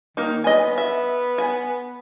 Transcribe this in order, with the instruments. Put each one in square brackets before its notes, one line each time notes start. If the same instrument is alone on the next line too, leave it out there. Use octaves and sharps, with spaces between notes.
[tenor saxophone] D#3 [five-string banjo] A#3 D#4
[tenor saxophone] B3 [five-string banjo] D#5 G#5
[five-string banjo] E5
G#5